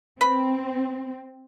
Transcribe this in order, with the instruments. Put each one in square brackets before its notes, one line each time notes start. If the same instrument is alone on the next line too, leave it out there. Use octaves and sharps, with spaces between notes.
[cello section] C4 [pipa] B4 B5